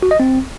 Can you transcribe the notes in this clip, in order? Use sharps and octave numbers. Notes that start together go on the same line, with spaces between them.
F#4
D#5
C4